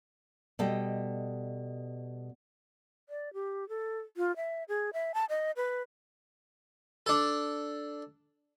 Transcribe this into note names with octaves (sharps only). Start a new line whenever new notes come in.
B2 G3 A4 D#5 G5
D5
G4
A4
F4
E5
G#4
E5
A5
D#5
B4
D4 A4